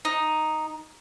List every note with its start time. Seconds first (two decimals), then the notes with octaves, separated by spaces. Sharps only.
0.05 D#4